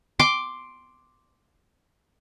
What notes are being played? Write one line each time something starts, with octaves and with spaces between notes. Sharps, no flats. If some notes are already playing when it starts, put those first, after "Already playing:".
C6 D6